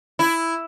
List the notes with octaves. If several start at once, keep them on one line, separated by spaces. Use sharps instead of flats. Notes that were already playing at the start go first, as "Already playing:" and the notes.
E4